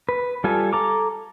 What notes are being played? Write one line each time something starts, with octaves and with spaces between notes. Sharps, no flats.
B4
G3 F4 A4 G#5
A4 A#5 D6